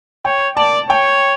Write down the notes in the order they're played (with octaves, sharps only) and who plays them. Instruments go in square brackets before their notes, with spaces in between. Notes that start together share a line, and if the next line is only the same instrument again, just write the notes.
[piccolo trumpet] C#5 [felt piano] G5
[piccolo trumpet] D5 [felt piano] A5
[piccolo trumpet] C#5 [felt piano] G5